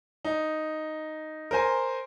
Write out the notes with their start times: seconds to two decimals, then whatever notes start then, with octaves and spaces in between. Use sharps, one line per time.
0.25 D#4
1.51 A#4 C5 G#5